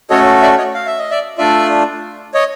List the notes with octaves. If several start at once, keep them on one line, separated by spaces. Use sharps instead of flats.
A3 C#4 F#4 A4 C#5 D#5
D5 E5
C#5 D#5
F5
E5
D#5
D5 E5
A3 D4 F4 D5 E5
C#5 D#5